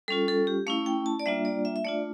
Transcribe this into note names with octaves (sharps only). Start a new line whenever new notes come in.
G3 C#4 F4 A4
A4
G4
A3 C#4 E4 F5
G5
A5
D5
G3 A#3 D4 F4 E5
D5
E5
E5
A3 D4 F4 D5